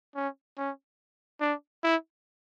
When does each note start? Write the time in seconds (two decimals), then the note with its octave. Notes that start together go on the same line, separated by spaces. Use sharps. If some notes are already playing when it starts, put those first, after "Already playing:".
0.15 C#4
0.58 C#4
1.41 D4
1.83 E4